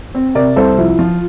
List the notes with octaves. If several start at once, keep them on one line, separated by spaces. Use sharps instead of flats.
C4
C3 A#4 D5
C2 A4 C5
F3 E4
F3 F4